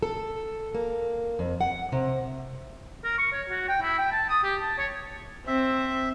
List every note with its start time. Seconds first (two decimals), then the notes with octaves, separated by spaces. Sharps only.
0.02 A4
0.75 A#3
1.39 F2
1.61 F#5
1.92 C3
3.04 A#4
3.18 C#6
3.33 C#5
3.49 F#4
3.69 G5
3.82 E4
3.98 G5
4.12 A5
4.29 D#6
4.43 G4
4.62 A5
4.78 C#5
5.47 C4 E5